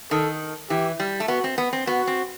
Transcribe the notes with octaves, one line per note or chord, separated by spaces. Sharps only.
D#3 A4
E3 G4
G3
A3
B3 F#4
C4
B3
C4
B3 F#4
C4